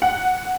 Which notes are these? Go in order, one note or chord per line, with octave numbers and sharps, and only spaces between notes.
F#5